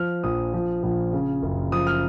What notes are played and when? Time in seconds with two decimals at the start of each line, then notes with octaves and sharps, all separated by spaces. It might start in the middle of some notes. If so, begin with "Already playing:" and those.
Already playing: F3 F6
0.24 A#1 D#6
0.54 F3
0.83 A#1
1.13 C#3
1.43 F#1
1.72 F3 D#6
1.87 F6